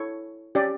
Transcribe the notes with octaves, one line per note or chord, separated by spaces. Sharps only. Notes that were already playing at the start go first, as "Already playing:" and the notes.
Already playing: E4 A4 C#5
C#4 G4 D5